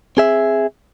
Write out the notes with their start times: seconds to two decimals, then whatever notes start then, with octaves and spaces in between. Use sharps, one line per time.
0.17 C4 G#4 E5